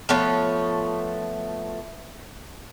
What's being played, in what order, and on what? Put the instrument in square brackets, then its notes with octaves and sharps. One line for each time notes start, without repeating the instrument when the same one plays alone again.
[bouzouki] F3 A3 B3 C#5